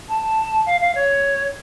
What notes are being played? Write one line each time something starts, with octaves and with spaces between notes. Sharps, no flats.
A5
F5
F5
C#5